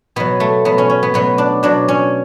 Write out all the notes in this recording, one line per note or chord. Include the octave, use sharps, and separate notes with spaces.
B2 F#3 B3
A3
B2 F#3 B3
C#4
C#4
B3
B2 F#3 B3
D4
B2 F#3 D4
C#4